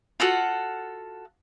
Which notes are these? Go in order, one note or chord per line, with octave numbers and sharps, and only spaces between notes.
F4 F#4 A4 F#5